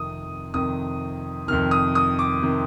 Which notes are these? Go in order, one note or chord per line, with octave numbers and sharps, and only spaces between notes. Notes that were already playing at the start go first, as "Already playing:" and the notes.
Already playing: F2 C3 D#3 D#6
F2 C3 D#3 D#6
F2 C3 D#3 F6
D#6
D#6
D6
C3 D#3